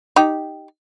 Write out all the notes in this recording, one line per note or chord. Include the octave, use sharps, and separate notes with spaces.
D#4 G4